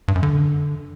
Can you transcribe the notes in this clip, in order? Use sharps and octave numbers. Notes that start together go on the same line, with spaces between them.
G2
F#2
D3